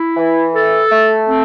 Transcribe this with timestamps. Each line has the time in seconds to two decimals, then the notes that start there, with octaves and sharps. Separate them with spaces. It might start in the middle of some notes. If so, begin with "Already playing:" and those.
Already playing: E4
0.17 E3
0.54 A4
0.91 A3
1.28 C4